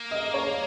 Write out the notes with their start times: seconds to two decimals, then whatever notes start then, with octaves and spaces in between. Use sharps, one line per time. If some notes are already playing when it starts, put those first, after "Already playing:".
Already playing: A#3
0.11 D#5
0.34 C#5